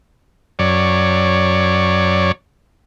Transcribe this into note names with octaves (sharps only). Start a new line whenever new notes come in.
F#2 C#5 D5